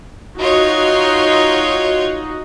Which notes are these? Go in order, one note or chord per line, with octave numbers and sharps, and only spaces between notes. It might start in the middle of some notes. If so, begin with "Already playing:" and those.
D#4 F4 F#4 C#5